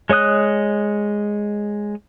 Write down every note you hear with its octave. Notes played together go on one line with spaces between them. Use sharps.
G#3 C#5 D#5 D#6 F#6